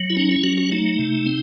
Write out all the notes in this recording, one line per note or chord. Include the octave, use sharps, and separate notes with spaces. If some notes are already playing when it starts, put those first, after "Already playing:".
Already playing: F#3
E4
C#4 D#4
E4
F#3 F#4
F#4
A3 D#4
C3
C4